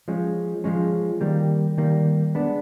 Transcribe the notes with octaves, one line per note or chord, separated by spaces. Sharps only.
F3 G#3 C#4
F3 G#3 C#4
D#3 G3 A#3
D#3 G3 A#3
G#3 B3 D4